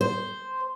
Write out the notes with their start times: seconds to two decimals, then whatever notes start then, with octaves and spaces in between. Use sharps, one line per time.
0.01 C5